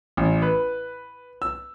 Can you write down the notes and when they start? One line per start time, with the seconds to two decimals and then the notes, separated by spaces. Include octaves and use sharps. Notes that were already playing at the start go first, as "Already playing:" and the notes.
0.17 A1
0.42 B4
1.42 E6